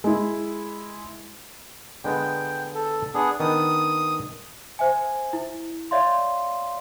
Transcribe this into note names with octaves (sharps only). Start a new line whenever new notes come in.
G#3 E4
D3 G#3 B3 G5
A4
B3 D4 G#4
D#3 B3 D4 D#6
C5 E5 G#5
E4
C#5 D5 E5 F5 C6